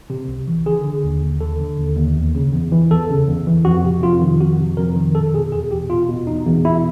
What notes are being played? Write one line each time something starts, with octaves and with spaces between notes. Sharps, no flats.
C3
C2
E3
D3 G#4
D3
D#2
D#2
D3 A4
D3
D#2
D#2
E2
C#3
E2
E3
E2 A4
C#3
E2
E3
F2 F#4
C3
F2 F4
D#3
F2 F#4
C3
F2 A#4
D#3
B2 A4
B2 G#4
E2 G#4
E2 G4
B2 F4
B2
E2 D#4
E2
B2 E4